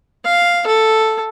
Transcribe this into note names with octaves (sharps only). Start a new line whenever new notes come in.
F5
A4